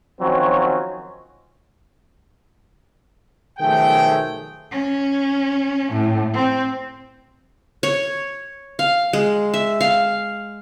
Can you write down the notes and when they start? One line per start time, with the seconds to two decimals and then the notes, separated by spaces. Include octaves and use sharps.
0.21 D#3 F3 F#3 C4 C#4
3.59 B1 D#3 F3 A3 G#4 G5
4.71 C#4
5.92 A2
6.33 C4
7.83 C#5
8.79 F5
9.13 G#3
9.54 E5
9.81 F5